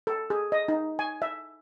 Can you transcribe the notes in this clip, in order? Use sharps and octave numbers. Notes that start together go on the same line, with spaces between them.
A4
G#4
D#5
D#4
G#5
E5